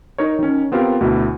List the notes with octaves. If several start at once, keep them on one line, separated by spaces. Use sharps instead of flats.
D#4 A#4 C#5
D#3 C#4
B3 C4 F4 G4 A#4
D2 B2 E4